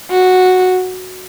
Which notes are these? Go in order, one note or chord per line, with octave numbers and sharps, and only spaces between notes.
F#4